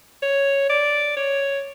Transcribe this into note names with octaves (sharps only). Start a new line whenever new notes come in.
C#5
D5
C#5